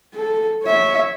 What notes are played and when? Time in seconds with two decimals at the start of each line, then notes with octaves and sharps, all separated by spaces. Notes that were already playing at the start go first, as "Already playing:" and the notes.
0.14 A4
0.63 C#5 E5